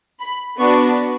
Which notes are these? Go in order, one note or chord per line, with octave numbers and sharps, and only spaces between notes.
B5
B3 D4 F#4 C#6